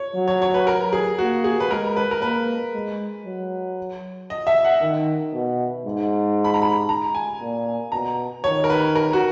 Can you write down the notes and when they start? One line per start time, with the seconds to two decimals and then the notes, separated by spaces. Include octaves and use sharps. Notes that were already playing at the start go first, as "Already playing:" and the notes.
Already playing: C#5
0.15 F#3
0.28 C#5
0.42 C#5
0.54 B4
0.67 A#4
0.93 G#4
1.18 A#3 F#4
1.44 G#4
1.60 B4
1.71 G#3 A#4
1.97 B4
2.11 A#4
2.22 A#3 B4
2.74 G#3
3.26 F#3
4.30 D#5
4.47 E5
4.65 F#5
4.81 D#3
5.33 B2
5.86 G#2
6.44 B5
6.54 A#5
6.62 B5
6.89 A#5
7.15 G#5
7.41 A#2
7.92 B2 A#5
8.44 D#3 C#5
8.64 A#4
8.70 B4
8.96 A#4
9.13 F#4